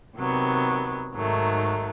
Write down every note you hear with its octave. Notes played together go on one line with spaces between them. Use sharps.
C3 D#3 F#3 B3
G#2 D#3 F#3 A3